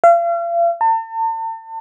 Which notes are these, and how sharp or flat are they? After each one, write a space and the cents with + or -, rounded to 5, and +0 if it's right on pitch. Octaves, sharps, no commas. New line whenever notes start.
F5 -40
A5 +40